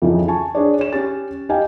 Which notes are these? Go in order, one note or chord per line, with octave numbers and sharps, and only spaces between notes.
F2 C#3 E3 F3 D#4
G#5 A5 C#6
D4 G#4 C#5 D5
C#5 E7
C#4 G4 A6
D#4 G4 D#5 F5 G5 G#5